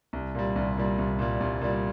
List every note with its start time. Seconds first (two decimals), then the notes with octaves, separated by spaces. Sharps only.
0.13 C2
0.35 A#2 G3
0.56 C2
0.77 A#2 G3
0.99 C2
1.19 A#2 G3
1.41 C2
1.62 A#2 G3